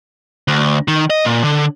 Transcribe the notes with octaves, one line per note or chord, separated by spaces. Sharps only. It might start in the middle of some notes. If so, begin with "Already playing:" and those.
D2
D#3
D#5
A#2
D3